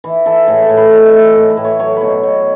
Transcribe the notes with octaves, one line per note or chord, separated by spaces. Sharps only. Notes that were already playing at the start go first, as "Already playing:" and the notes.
E3
E3 A4
A2 G#4
A4
A2
B4
E3 D#5
E5
E3
D#5
A2
B4
A2
C#5
F#3 C#5
B2 B4 C#5
B2 D#5